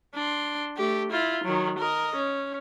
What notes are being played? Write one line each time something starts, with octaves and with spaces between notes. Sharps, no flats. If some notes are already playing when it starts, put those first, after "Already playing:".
D4 C6
A3 G4
E4 F4
D#3 F#3
A#4 D#5
C#4